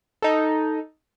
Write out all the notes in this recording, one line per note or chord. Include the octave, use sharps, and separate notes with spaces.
D#4 A4